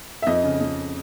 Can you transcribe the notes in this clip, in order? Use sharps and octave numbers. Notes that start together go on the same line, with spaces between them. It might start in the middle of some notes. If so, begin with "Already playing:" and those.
E5
F2 D#5
C#3
F2